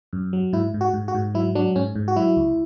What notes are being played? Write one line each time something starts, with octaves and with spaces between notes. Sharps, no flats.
F#2
F#3
G#2 E4
G#2
F#4
G#2
F#4
G#2
F#3 E4
F#3 D4
G#2 C#4
G#2
F#4
F#3 E4
C#2